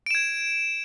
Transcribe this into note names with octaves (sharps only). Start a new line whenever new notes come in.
G#6 D7 E7